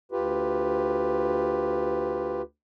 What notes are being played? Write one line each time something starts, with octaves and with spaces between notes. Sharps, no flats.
D2 F4 G4 B4